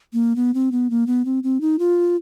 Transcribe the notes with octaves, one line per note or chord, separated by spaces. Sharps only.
A#3
B3
C4
B3
A#3
B3
C4
C4
D#4
F4